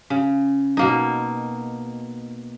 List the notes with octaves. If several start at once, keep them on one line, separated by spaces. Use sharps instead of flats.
C#3
B2 A#3 D#4